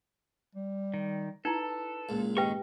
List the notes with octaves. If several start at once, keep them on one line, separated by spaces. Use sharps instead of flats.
G3
D#3
D#4 E4 A4 B4
C#2 A#2
G2 D#3 G4 B4 D#5 G5 C#6